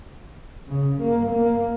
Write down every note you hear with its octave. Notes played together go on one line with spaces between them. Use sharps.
C#3
A#3
A#3